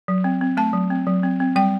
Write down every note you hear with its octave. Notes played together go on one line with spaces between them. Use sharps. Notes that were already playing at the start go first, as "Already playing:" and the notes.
F#3
C4
C4
A3 A5
F#3
C4
F#3
C4
C4
G3 G5